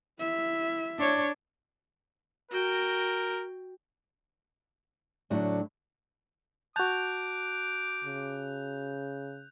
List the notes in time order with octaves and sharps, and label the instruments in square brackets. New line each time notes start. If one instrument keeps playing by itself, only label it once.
[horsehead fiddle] E4 E5
[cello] D4 C#5
[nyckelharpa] F#4 G5 [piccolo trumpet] A#4
[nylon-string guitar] A2 D3 F#3 [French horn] D4
[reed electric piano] F#4 A5 [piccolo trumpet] D6 [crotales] F#6 G6 F7
[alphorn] C#3